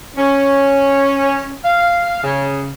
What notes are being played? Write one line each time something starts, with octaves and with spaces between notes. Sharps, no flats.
C#4
F5
C#3